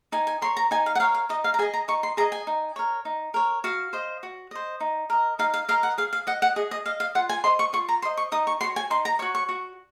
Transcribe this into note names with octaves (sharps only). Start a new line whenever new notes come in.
D#4 G#5
G#5
A#4 C#5 C6
A#5
D#4 G#5
F5
F#5
A#4 C#5 F5
F5
D#4 D#5
F5
A#5
G#4 D#5 G#5
A#5
D#4 C#6
C6
G#4 D#5 A#5
G#5
D#4
A#4 C#5
D#4
A#4 C#5
F#4 F5
C5 D#5
F#4
C5 D#5
D#4
A#4 D#5
D#4 F5
F5
A#4 D#5 F5
F#5
G#4 F5
F5
D#5 F#5
F#5
G#4 D#5
D#5
D#5 F5
F5
F4 F#5
G#5
C5 D#5 C6
C#6
F4 C#6
A#5
C5 D#5 C6
C#6
D#4 D#6
C#6
F#4 C#5 C6
G#5
D#4 C6
A#5
F#4 C#5 C#6
C#6
F#4